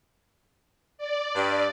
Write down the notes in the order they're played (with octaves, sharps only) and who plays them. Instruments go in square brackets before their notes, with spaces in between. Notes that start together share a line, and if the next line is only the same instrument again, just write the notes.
[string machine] D5
[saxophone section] G2